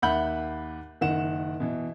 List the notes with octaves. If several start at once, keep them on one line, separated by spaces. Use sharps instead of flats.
D#2 E5 F#5 B5 G6 F#7
F#1 D#3 F#5 E7
B2 E3